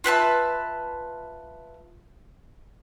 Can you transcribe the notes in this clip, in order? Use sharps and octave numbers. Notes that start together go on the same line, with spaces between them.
F4 B4 E5 A5